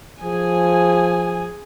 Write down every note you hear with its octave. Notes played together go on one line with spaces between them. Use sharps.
F3 G#4 G#5